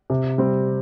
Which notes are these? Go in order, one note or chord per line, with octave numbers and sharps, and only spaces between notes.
C3
G3 C4